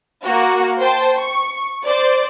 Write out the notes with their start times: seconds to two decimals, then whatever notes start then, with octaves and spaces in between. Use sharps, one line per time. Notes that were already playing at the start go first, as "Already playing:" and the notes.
0.24 A#3 F#4
0.80 C5 G5 A5
1.18 C#6
1.86 C5 D5